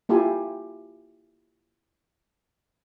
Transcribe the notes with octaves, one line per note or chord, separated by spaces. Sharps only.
A#3 E4 F4 G4 G#5